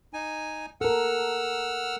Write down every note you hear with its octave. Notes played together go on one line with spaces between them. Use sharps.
D#4 G#5
A4 A#4 F#5 E6 F6